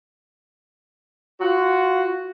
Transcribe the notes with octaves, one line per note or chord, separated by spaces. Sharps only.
F4 F#4